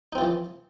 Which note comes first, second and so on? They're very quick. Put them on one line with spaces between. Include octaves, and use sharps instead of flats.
D#4 C4 F4 E3 F3